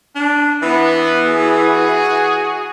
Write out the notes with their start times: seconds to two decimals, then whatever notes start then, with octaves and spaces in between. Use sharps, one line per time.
0.15 D4
0.62 E3 B3
1.26 F#4 G#4